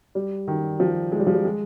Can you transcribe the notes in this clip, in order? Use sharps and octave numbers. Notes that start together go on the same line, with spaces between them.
G3
D#3
F3
G#3
G3
F3
G3
G#3